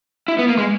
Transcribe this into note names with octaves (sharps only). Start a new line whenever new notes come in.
E4
B3
A#3
G#3